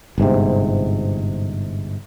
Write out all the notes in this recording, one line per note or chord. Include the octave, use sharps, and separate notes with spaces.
G1 G#2 C3